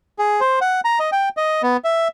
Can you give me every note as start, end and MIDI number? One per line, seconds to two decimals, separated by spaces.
0.19 0.40 68
0.40 0.59 72
0.61 0.81 78
0.85 0.99 82
0.99 1.10 75
1.12 1.29 79
1.37 1.62 75
1.63 1.77 59
1.84 2.08 76